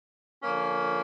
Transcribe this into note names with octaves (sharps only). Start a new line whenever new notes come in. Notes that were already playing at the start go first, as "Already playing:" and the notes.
D3 F3 A#3 C#4